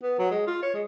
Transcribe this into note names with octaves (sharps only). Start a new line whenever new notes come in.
B3
F#3
G#3
F4
C#5
G#3